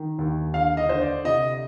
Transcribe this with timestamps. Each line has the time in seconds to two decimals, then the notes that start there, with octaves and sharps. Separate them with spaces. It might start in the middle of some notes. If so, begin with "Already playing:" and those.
Already playing: D#3
0.18 D#2
0.54 D3 F5
0.77 D#5
0.89 D3 C5
1.02 D5
1.24 C3 D#5